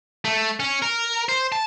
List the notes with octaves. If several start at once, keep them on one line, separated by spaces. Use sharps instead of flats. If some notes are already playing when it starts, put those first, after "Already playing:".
A3
C#4
A#4
C5
A5